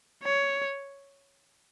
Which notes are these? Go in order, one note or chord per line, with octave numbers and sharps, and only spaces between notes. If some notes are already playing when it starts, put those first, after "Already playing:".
C#5